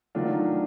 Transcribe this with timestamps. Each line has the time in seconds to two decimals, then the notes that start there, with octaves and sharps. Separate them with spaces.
0.15 D#3 F#3 A3 D4 F4